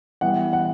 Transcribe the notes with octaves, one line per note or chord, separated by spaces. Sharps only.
E3 G3 B3 F#5
F#5